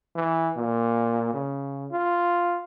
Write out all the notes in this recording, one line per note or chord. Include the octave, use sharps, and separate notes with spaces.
E3
A#2
C#3
F4